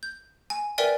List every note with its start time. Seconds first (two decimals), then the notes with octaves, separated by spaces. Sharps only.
0.03 G6
0.50 G#5
0.78 A#4 B4 D5 E5 G5 G#5